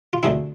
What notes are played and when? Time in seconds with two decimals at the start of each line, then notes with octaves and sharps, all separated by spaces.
0.13 F4
0.23 D2 D3 A3 C4 E4 G#4